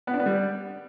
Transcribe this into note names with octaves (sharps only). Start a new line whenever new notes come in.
B3
D4
B3
G3